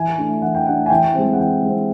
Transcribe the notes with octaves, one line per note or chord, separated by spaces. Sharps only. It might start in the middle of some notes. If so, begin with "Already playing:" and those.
Already playing: E3 G#5
A3 D4
E3 F#5
G5
A3 D4 F#5
G#5
E3 G5
G#3 C4
F#5
E3 G5
G#3 C4